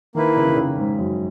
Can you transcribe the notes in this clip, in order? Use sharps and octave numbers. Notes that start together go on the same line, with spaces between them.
D#3 A#3 E4 B4
C#3
D#3
C#3
G#2
F#2